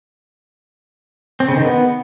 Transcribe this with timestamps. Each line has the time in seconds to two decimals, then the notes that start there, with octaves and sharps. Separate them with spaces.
1.40 C4
1.48 C#3
1.57 D#3
1.65 B3